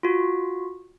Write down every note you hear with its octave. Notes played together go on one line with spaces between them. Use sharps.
F4 F#4